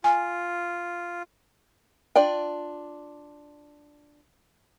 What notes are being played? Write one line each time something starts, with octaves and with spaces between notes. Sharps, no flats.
F4 G#5
D4 F4 D5 G5